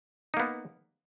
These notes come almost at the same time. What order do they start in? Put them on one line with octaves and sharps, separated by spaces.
D#4 A#3 B3